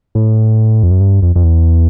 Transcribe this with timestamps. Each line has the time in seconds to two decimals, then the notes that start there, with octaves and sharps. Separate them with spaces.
0.15 A2
0.83 F2
0.91 F#2
1.01 G2
1.22 F2
1.36 F2
1.44 E2